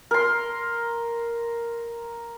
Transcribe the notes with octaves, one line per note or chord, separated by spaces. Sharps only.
A#4 C6